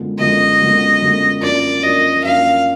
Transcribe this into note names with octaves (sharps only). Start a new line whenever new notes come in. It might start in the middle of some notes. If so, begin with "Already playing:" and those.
Already playing: F#2 D3 F3 G#3 B3
F#2 D3 F3 G#3 B3 D#5
F#2 D3 F3 G#3 B3
F#2 D3 F3 G#3 B3
F#2 F3 A#3 D4 D5
F#2 F3 A#3 D4 D#5
F#2 F3 A#3 D4 F5